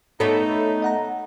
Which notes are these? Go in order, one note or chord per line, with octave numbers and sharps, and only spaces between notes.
A3 B3 D#4 A4 C#5 D5
D#5 F#5 A#5